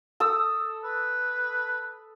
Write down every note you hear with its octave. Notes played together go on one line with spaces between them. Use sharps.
A4 D#6 E6
B4